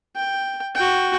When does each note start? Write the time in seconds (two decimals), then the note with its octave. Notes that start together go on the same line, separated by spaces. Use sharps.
0.16 G5
0.75 F#4 G5